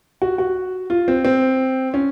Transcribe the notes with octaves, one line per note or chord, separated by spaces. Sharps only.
F#4
F#4
F4
C4
C4
C#4